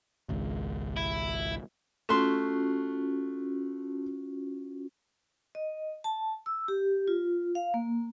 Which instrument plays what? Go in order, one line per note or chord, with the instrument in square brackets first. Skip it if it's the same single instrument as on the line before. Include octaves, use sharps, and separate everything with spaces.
[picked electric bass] G#1 C#2
[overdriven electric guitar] E4
[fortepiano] A3 C6 [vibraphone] C#4 F4 F#4
[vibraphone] D#5
A5
E6
G4
F4
F5
A#3